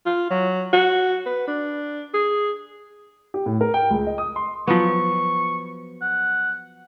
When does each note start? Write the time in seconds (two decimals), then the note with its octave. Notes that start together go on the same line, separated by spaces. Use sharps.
0.06 F4
0.30 F#3
0.73 F#4
1.26 B4
1.48 D4
2.14 G#4
3.34 G4
3.46 A2
3.61 A#4
3.74 G5
3.91 C#2
4.07 D#5
4.18 D#6
4.36 C6
4.67 F3 F#3 B3 C#6
6.02 F#5